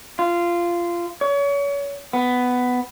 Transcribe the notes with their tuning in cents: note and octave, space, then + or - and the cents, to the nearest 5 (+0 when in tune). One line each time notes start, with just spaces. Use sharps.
F4 -15
C#5 +35
B3 +10